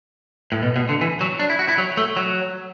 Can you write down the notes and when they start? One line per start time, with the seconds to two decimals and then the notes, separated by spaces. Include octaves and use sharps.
0.52 A2
0.63 B2
0.76 B2
0.89 D3
1.01 E3
1.21 F#3
1.39 D4
1.50 E4
1.59 F#4
1.68 E4
1.78 F#3
1.97 A3
2.17 F#3